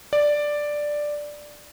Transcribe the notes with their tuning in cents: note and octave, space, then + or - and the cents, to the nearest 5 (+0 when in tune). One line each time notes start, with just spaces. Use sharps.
D5 +5